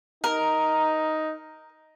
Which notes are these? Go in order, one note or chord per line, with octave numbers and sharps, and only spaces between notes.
D#4 A#4